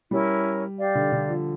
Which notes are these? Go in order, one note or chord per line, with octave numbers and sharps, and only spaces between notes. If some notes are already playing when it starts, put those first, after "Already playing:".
G3 C#4 E4 A#4
G4 D5 F5
D3
D3
F3